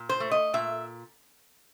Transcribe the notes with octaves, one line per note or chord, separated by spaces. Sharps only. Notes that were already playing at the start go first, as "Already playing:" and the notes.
Already playing: A#2
C5
A3
D#5
A#2 E5